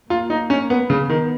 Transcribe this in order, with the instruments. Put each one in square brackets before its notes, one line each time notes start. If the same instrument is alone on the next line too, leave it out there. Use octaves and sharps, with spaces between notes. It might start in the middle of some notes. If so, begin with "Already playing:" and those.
[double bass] A#3 [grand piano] F4
[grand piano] D#4
C#4
B3
[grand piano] C#3 [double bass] B3
[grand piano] D#3